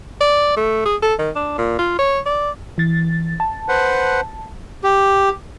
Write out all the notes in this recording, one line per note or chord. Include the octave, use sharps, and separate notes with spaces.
D5
A3
G#4
A4
D#3
D4
A#2
F4
C#5
D5
E3 A6
A5
B4 C5 F#5
G4